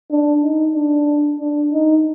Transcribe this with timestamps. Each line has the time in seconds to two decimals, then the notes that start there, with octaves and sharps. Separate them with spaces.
0.11 D4
0.43 D#4
0.75 D4
1.40 D4
1.73 D#4